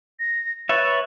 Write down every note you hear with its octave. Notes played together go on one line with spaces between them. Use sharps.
A#6
B4 C#5 E5 A6